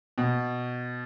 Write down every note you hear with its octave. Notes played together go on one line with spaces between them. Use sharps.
B2